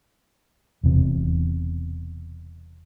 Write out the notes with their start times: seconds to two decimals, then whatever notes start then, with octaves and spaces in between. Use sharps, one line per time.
0.83 E1 E2 C3